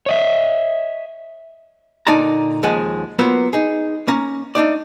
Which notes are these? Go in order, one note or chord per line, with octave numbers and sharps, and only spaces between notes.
C#5 D#5 E5
A#2 D3 D#4 D5 A5 A#5
D#2 C#3 F3 G#3 G#4 F#5
F#3 A#3 B3 F4 B4 C5
D#4 G#4
A#3 C#4 A#5
A3 D4 D#4 D5